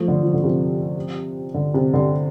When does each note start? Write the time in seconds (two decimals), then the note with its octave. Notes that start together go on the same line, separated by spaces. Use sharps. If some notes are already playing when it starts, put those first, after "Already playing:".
Already playing: F3 A3
0.08 D3
0.23 F3
0.33 D3
0.43 C3 F3
1.54 D3
1.74 C3
1.94 D3